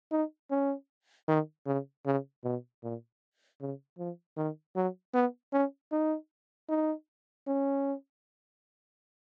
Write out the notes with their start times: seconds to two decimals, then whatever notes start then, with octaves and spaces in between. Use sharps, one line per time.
0.11 D#4
0.51 C#4
1.28 D#3
1.66 C#3
2.06 C#3
2.44 B2
2.83 A#2
3.61 C#3
3.99 F3
4.37 D#3
4.76 F#3
5.14 B3
5.53 C#4
5.92 D#4
6.69 D#4
7.47 C#4